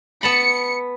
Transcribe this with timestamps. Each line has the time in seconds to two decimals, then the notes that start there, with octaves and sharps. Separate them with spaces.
0.23 B3 A5 B5 C#7